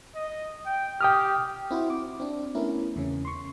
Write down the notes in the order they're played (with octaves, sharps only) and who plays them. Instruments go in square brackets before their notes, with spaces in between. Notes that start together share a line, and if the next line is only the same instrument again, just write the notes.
[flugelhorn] D#5
G5
[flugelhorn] G4 [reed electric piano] G5 D#6 F6
[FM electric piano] C4 E4 F#4 C5
D6
C4 D4
A3 B3 C#4 E4 A#4
E2 C#3 C#4
C6 C#6